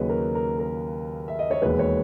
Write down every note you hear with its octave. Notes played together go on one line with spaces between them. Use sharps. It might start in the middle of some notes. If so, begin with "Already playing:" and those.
Already playing: D#2 C#3 F#3 B4 C#5 D#5
A#4
A#4
A#4
E5
D#5
C#5
E1 D#2 D#3 G#3 B4
C#5